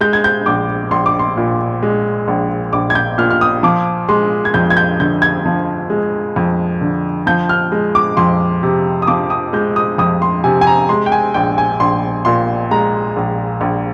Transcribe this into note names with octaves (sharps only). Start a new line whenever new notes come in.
G#3 G6
G#6
G6
A#1 D6
A#1 C6
D6
C6
A#2
G#3
A#1
A#1 D6
G#6
G6
A#2 F6
F6
D#6
F3 D6
G#3 C6
G#6
F2 G6
G#6
G6
D3 G6
G#6
F3
G#3
F2
D3
F3 G6
F6
G#3
D6
F2 C6
C3
D#6
F3 D6
D#6
G#3 G6
D#6
F2 D#6
C6
C3 G#5
G#5
A#5
G#3 C6
G5
G#5
A#1 G5
G#5
A#1 C6
A#2 C6
G#3 A#5
A#1
A#1